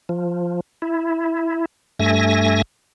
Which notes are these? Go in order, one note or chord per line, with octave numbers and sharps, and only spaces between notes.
F3
E4
G2 A3 E5 G#5 A#6